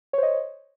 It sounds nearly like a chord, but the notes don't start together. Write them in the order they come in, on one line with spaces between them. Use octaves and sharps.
C#5 C5 D#5